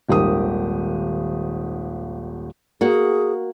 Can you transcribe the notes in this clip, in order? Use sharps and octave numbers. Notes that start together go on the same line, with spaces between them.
D#1 G#1 G4 A#4 D#6
A#3 F#4 G#4